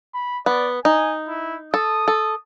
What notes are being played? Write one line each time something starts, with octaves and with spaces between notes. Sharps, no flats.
B5
B3 D5
D#4 G#5
E4
A4 D#6
A4